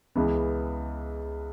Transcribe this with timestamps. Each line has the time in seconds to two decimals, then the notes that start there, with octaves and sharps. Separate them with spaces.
0.15 C#2 C#3 E3 B3